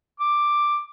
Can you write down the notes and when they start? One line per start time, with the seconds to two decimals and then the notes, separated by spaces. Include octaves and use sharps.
0.20 D6